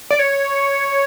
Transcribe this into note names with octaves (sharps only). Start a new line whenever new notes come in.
D5
C#5